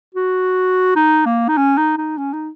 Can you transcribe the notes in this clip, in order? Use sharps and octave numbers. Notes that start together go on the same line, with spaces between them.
F#4
D#4
A#3
D#4
C#4
D#4
D#4
C#4
D#4